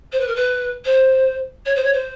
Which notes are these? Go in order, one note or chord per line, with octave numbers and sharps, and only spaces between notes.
C5
B4
A#4
B4
C5
C#5
C5
C#5
C5